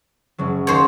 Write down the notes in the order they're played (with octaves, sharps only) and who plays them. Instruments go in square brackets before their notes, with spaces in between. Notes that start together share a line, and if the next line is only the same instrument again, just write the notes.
[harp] F#1 F#3
[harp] D#2 [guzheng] C5 C#5